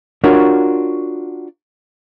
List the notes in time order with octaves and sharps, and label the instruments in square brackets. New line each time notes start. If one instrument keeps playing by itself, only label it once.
[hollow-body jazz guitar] D4 F4 F#4 A#4 C#5